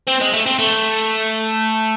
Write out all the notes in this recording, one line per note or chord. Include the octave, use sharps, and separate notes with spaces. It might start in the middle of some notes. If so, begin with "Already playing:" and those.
C4
G#3
A3
C4
A3